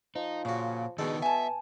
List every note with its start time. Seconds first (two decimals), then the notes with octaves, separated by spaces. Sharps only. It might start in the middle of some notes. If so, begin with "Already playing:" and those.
0.15 F3 D#4
0.45 A#2 C#3 F#4
0.98 B2 D#3 G#3 D4 D#4 A4
1.22 B3 E5 G#5 A5